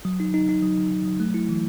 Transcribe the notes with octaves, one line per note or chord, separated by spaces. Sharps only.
F#3
D#4
D#4
D#4
F#3
F#3
D#4
F#3
A3
E4
E3